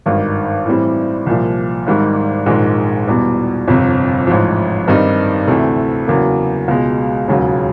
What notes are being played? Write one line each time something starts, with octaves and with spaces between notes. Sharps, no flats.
G#1 G2 D#3
A2 E3 G3 C4
C2 A#2 F3
G#1 G#2 D#3 G3
A#1 G#2 D#3 G#3
E2 B2 G3
G1 F2 C3
A1 G#2 F3
G2 D#3 G3 C4 D#4
D2 C3 E3 A3
E2 C#3 F#3 A#3
C#2 B2 G#3
E1 D#2 C#3 F#3